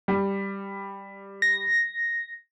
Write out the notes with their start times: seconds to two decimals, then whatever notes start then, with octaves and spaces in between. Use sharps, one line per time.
0.08 G3
1.42 A#6